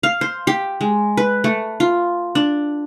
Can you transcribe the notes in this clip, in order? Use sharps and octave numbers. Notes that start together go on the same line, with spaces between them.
F5
C5
G4
G#3
B4
A3
F4
D4